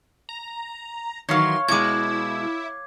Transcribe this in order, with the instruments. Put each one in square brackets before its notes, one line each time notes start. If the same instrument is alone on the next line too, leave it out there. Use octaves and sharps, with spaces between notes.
[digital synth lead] A#5
[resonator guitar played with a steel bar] D#3 E3 F#3 [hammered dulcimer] C#5 F5 [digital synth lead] C6
[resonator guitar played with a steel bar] B2 G#3 [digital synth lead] E4 [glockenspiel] D6 G#6